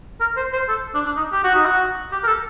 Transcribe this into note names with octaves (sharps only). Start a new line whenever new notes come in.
A#4
C5
C5
A4
D4
D4
D#4
G4
F#4
D#4
F#4
G4
A#4
A4